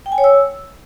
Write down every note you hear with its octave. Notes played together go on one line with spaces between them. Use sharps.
G5
G#5
C#5
E6